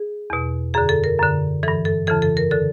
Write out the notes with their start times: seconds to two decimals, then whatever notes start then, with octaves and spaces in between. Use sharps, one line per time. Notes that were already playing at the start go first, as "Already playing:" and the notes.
Already playing: G#4
0.30 E2 B2
0.74 F#2 D3 G#4
0.89 A4
1.04 A#4
1.19 F#2 D3
1.63 G2 E3 A4
1.85 A4
2.07 F2 C#3 E3 A4
2.22 A4
2.37 A#4
2.51 D3 A4